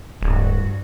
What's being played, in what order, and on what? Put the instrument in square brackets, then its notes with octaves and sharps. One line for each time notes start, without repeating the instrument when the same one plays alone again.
[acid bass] D1 [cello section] G2 F#4